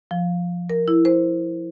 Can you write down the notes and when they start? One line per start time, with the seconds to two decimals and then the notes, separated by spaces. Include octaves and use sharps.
0.11 F3
0.70 A#4
0.88 E4
1.05 C5